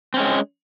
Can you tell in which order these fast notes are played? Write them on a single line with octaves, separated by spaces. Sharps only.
C4 C#4 G#3